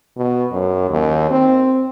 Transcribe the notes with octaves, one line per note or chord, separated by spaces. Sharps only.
B2
F#2
D#2
C4